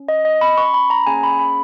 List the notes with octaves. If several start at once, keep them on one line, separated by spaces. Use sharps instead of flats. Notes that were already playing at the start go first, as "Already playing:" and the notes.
Already playing: C#4
D#5
D#5
B5
C#6
B5
A#5
A#3 C#4 G#4 G#5
B5
B5